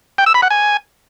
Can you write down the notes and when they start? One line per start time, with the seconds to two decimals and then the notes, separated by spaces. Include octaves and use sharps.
0.18 G5
0.26 E6
0.34 B5
0.42 F#5
0.50 G#5